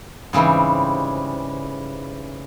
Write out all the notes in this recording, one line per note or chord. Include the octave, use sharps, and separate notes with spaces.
G#2 C#3 E3 G3 C4